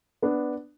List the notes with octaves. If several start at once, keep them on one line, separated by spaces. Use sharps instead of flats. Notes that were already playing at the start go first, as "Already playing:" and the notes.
B3 D4